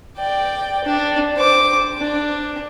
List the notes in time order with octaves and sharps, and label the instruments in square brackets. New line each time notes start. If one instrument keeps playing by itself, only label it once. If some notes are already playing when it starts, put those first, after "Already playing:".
[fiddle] D5 G5
D4
C5 D6
D4